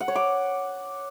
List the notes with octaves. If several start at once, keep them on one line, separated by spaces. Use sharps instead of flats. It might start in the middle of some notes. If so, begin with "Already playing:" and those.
F#5
C#5
D6